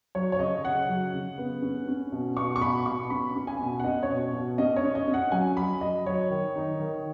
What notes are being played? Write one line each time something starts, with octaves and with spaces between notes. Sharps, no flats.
F#3 C#5
C#5
C#3 D#5
C#3 F#5
F#3
C#3
B3
C#4
C#4
B2
B2 C#6
C#6
B2 B5
B2 C#6
C#4 B5
C#4
G#5
B2
F#5
C#4 D#5
C#5
B2
B2
C#4 D#5
C#5
C#4
D#5
C#4
F#5
F#3 G#5
F#3 B5
F#3 D#5
F#3 C#5
D#3
D#4
D#3